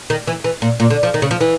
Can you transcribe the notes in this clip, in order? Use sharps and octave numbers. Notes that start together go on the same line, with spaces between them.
D#3
E3
E3
A#2
A#2
D3
F3
D#3
C#3
F3
E3